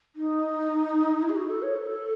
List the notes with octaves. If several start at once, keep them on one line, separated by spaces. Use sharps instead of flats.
D#4
E4
G#4
F#4
A4
C#5
A4